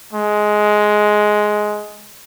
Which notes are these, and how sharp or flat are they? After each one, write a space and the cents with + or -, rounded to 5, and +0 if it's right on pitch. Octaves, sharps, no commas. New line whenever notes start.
G#3 +10